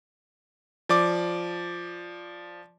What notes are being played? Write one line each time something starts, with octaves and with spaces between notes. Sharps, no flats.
F3 D5 D6